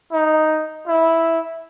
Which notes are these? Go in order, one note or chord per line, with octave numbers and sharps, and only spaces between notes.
D#4
E4